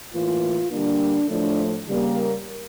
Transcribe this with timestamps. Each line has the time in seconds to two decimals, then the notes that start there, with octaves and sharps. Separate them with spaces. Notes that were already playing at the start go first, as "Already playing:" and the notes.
0.13 A2 E3 A#3 F4
0.71 D3 G3 A#3 D4
1.29 A2 F3 A3 D4
1.86 C#3 G3 A#3